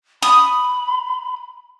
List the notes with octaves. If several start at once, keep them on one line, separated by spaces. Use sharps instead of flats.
B5 D#6